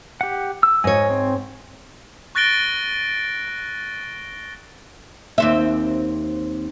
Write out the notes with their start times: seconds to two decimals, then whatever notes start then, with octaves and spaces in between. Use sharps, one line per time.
0.21 G4 F#5
0.63 E6
0.84 G#2 C#5 D#5 G#5
1.10 C4
2.35 C#6 F#6 A6 A#6 D7 G7
5.38 D#2 C4 E5